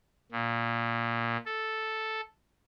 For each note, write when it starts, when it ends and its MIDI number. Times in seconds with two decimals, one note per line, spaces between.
0.32 1.37 46
1.46 2.21 69